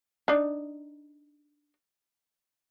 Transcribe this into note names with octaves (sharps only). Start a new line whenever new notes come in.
D4 D#4